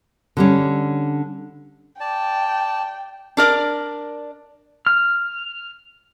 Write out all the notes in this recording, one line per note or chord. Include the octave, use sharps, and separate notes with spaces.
D3 G3 C#4
D5 G5 A5
D4 A#4 D5
F6